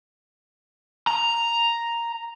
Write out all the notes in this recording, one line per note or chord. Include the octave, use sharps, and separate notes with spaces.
A#5